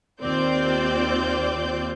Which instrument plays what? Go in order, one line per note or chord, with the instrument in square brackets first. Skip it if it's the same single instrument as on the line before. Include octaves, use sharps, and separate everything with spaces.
[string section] D#2 C4 F4 C5 D5 G6